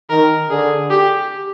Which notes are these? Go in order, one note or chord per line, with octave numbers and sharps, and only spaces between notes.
D#3 A#4
D3 G#4
G4